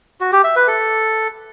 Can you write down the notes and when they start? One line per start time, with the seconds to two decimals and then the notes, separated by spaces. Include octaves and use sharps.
0.21 F#4
0.32 G4
0.44 E5
0.56 B4
0.67 A4